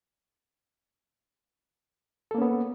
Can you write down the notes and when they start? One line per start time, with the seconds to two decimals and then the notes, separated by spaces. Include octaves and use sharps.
2.31 A4
2.35 A#3
2.38 C#4
2.42 B3